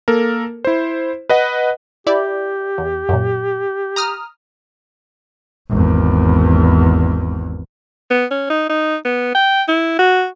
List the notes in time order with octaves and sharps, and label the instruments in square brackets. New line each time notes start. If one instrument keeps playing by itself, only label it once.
[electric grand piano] A#3 A4 A#4
E4 C5
B4 D#5 F#5
[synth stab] E4 D5 [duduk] G4
[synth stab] E2
F#2 A#2
A#5 D#6 F6
[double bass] G#1 E2
[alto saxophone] B3
C#4
D#4
D#4
B3
G5
E4
F#4